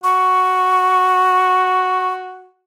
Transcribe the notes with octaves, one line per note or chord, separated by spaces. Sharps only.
F#4 C#6